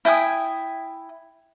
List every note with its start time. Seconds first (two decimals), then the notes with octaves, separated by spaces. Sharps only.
0.05 E4 G5 G#5 D#6